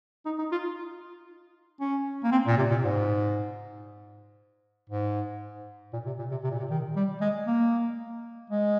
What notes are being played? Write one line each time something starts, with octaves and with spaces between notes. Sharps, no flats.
D#4
D#4
F4
C#4
A#3
C4
A#2
C3
A#2
G#2
G#2
A#2
C3
A#2
C3
C3
A#2
C3
D#3
G3
G#3
A#3
G#3